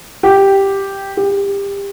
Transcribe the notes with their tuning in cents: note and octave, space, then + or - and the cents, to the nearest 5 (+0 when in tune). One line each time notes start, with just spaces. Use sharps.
G4 +0
G4 +25